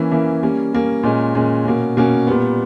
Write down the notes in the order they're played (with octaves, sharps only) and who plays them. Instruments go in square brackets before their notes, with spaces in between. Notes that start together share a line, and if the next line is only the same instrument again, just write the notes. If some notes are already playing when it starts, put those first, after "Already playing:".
Already playing: [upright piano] E3 A#3 C#4 E4
E3 A#3 C#4 E4
G3 A#3 C#4
G3 A#3 C#4
A#2 G#3 C#4
A#2 G#3 C#4
B2 A#3 C#4
B2 A#3 C#4
A#2 G3 B3